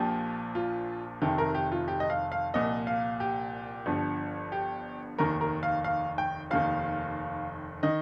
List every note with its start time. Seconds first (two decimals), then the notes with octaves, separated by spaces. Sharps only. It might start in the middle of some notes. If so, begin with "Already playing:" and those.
Already playing: A#1 A#2 F3 G4
0.55 F4
1.22 F1 F2 C3 D#3 G4
1.38 A#4
1.54 G4
1.72 F4
1.88 G4
2.00 D#5
2.10 F5
2.32 F5
2.54 C2 A#2 F3 D#5
2.87 F5
3.20 G4
3.86 G1 G2 F3
4.52 G4
5.18 F1 D#2 D#3 A#4
5.41 A#4
5.63 F5
5.84 F5
6.18 G5
6.51 F1 D#2 D#3 F5
7.83 D#3 D#5